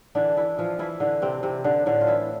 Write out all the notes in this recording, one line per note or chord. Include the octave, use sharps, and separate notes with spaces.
D3 E3 D4
E3 E4
E3 F3 F4
E3 E4
D3 E3 D4
C3 C4
C3 E3 C4
D3 D4
A2 D3 D4
F4
E3 E4